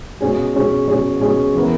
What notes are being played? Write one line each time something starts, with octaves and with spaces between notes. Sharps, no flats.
B2 G#3 C#4 G#4
B2 G#3 C#4 G#4
B2 G#3 C#4 G#4
B2 G#3 C#4 G#4
E3 G#3 B3 E4 A#4